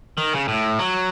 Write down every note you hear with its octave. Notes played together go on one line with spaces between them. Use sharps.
D#3
C#3
A2
F#3